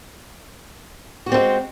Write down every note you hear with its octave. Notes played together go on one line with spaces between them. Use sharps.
G#3 A3 C4 F#4 G4